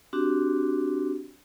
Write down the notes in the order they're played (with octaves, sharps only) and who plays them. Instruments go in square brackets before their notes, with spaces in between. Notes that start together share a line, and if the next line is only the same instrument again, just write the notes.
[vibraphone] C4 D4 F#4 G4